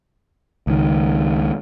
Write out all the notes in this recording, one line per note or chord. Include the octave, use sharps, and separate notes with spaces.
C#2 D#3